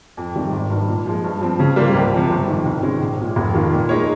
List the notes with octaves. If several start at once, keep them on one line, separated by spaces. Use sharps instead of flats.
F2
C3 D#3 G3
G#1
G2 D#3
A#2
F3 G#3
G2
F3 C4
C#3
G3 A#3 F4 C5
C#2
C3 F3
G1
F2 D#3
C2
C3 D#3 G#3 C#4
A#1
A#2 G#3
F1
D#2 D#3 A#3 F4
A#2
G#3 D#4 A#4 C#5